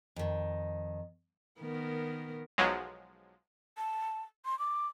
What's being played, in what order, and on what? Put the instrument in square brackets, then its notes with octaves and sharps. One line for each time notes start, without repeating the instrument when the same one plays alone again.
[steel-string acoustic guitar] F2 D#3
[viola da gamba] D#3 B3 A#4
[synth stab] B1 F3 F#3 G#3
[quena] A5
C6
D6